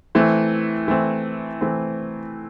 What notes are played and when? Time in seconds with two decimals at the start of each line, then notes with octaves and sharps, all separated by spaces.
0.15 E3 A3 C4
0.88 E3 A3 C4
1.61 E3 A3 C4